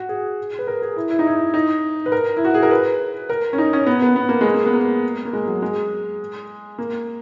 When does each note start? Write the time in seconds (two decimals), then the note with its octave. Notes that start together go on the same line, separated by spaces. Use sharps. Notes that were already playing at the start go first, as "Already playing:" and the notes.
Already playing: F#4
0.09 G#4
0.59 B4
0.67 A#4
0.82 G#4
0.96 E4
1.10 E4
1.19 D#4
1.27 E4
1.54 D#4
2.06 B4
2.12 A#4
2.37 E4
2.45 F#4
2.54 G#4
2.63 A#4
2.71 B4
3.29 A#4
3.53 C#4
3.58 D#4
3.73 C#4
3.86 B3
4.02 B3
4.16 B3
4.29 A#3
4.41 G#3
4.54 A#3
4.66 B3
4.74 A#3
5.25 A#3
5.33 G#3
5.47 F#3
5.62 G#3
6.78 A#3